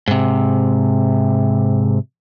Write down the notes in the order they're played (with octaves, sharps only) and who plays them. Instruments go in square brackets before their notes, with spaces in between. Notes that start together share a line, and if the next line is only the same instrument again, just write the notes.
[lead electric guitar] G#2 C3